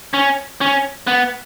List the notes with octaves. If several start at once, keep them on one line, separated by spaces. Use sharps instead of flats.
C#4
C#4
B3